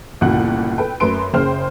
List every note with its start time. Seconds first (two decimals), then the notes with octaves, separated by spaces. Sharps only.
0.21 G1 C#2 A#2 E3 F#4 F#5
0.78 A4 B4 G5
1.00 F#2 A3 B4 C6 D7
1.33 F#1 C#3 C5 G5 F6